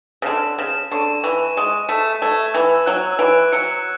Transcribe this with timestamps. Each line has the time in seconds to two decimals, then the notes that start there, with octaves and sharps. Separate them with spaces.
0.22 C#3
0.26 D3 E7
0.58 C#3 E7
0.91 D3 C#6
1.24 E3 C#6
1.56 G#3 E7
1.89 A3 E7
2.22 A3 G#6
2.54 E3 E6
2.86 F#3 F#6
3.19 E3 D7
3.52 F#3 C#7